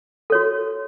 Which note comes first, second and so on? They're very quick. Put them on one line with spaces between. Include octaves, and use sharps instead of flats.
A4 C#5 F#4